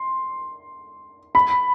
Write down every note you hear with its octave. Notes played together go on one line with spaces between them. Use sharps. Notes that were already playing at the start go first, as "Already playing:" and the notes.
Already playing: C6
B5